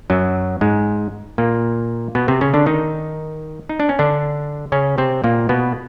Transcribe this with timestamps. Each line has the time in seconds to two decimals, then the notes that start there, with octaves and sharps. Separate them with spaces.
0.10 F#2 F#3
0.61 G#2 G#3
1.38 A#2 A#3
2.15 B2 B3
2.28 C3 C4
2.41 C#3 C#4
2.54 D3 D4
2.66 D#3 D#4
3.69 D#4
3.80 D4
3.89 C#4
3.99 D3 D4
4.72 C#3 C#4
4.98 C3 C4
5.24 A#2 A#3
5.49 B2 B3